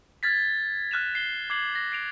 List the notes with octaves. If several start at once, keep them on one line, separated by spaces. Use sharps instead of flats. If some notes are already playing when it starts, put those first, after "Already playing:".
F6 G#6 A6 B6
F6 F#6 E7 F7
C7 G7
D6 G#6 C7 F#7
A#6
C7 D7 F7